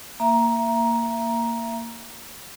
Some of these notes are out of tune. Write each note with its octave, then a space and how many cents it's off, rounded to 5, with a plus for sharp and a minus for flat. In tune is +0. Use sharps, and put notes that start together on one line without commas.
A#3 -10 E5 +25 A#5 +10